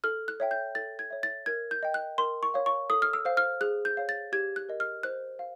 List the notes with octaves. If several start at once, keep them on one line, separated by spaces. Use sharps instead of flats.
A4 F6
F#6
C#5 E5 G5
G6
A4 A6
G#6
C#5 E5
A6
A#4 G#6
G6
D#5 G5
F#6
A#4 C6
C#6
C#5 F5
C#6
A4 D#6
F6
E6
C5 F5
F6
G#4 F#6
G6
C#5 F5
A6
G4 G#6
F#6
A#4 D#5
F6
C5 F#6
F5